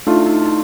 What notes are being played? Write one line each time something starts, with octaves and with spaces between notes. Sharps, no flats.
A3 D4 D#4 F4
E4
D#4
E4
D#4